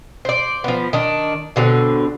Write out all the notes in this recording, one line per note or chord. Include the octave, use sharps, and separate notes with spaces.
C5 D5
F3 B3
D#3 D4
B2 D3 F#3 C4